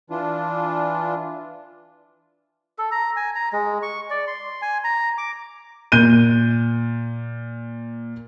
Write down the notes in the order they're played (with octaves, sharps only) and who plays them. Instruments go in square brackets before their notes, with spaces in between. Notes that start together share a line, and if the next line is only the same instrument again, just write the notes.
[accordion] E3 D4 F4
[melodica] A4
A#5
G#5
A#5
G#3
C#6
D5
C6
G#5
A#5
D6
[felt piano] A#2 G6 D#7